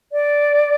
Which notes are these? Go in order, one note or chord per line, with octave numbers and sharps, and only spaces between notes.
D5